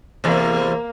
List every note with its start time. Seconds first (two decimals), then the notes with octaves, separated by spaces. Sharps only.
0.24 E2 C3 A#3